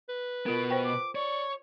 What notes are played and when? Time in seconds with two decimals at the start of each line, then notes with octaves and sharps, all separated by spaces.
0.09 B4
0.46 B2 B3 F4 A#4 D7
0.70 C5 G5 C#6
0.84 D6
1.15 C#5 D5 C#6